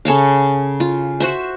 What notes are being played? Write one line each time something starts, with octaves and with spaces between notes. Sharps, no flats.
C#3 A4 C#5 F5
F4
F#4 C5 E5